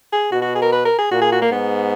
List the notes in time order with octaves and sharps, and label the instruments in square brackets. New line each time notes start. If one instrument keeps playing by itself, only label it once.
[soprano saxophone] G#4
[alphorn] B2 [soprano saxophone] F#4
[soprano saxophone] F#4
G#4
A#4
B4
A#4
G#4
[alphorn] A#2 [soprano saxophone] F#4
[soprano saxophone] G#4
F#4
A#3
[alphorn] G#2 [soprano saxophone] B3